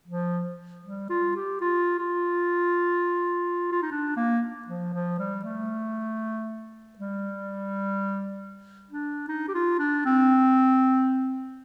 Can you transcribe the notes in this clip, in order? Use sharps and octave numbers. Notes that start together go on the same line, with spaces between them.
F3
G3
F4
G4
F4
F4
F4
D#4
D4
A#3
F3
F3
G3
A3
G3
D4
D#4
G4
F4
D4
C4